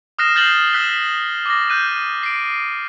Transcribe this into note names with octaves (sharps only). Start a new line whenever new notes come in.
D#6 F6 F#6 A#6 C7 E7
F6 G6 A6 C7 F#7 G7
E6 F#6 B6 E7 G7
D6 A#6
F#6 G6 D#7
C7 D7